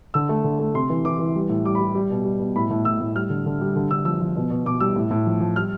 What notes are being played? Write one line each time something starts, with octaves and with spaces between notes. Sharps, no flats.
D3 E6
A3
D3
A3
C3 C6
E3
E3 D6
E3
G3
A2
G3 D6
B5
G3
G3
B2
G3
B2
A2 B5
A2
A2 E6
A2
G3 F6
D3
D3
G3
D3
D3 E6
F3 E6
F3
B2
B2
B2 D6
G3 E6
A2
A2
F3
F3
G3 F6